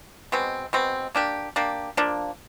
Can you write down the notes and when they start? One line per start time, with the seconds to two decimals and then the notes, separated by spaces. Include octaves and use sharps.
0.32 B2 G#3 C4
0.73 B2 G#3 C4
1.15 A#3 D4 G4
1.56 A#3 D4 G4
1.97 F3 A#3 D4